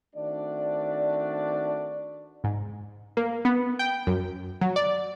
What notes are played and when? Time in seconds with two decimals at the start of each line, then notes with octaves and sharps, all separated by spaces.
0.16 D#3 A3 C4 D4 F#4 D5
2.44 G#2
3.17 A#3
3.45 B3
3.79 G5
4.07 F#2
4.61 F#3
4.76 D5